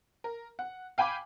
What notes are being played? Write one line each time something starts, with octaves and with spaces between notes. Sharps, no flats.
A#4
F#5
F5 G5 G#5 B5 D6